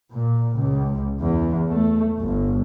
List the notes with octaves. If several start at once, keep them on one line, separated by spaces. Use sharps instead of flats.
A#2
C#2
E2
A3
G1